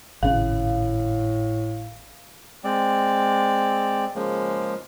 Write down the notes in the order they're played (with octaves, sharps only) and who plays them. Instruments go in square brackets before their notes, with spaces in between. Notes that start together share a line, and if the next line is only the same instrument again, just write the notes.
[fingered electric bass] G#1 C#3 [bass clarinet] A2 [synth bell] F5
[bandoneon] G#3 C4 D5
C#3 F3 G#3 A#3